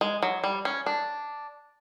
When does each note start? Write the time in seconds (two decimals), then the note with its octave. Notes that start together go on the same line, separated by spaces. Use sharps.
0.01 G#3
0.23 F#3
0.44 G3
0.65 C#4
0.86 D4